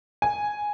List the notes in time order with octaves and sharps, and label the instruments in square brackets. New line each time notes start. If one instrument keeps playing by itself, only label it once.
[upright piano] G#5